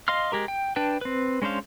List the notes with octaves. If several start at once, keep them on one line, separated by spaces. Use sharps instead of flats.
D#5 F5 C6 F6
G#3 G4 A#4
G5
D4 B4 G5 A5
C4 B4
G#3 C#4 D4 C5 F5